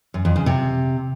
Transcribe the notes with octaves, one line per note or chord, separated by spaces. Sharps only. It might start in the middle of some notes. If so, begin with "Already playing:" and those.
F#2
F2
C#3
C3